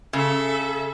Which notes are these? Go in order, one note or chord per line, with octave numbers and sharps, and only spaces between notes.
C#3 A4 E5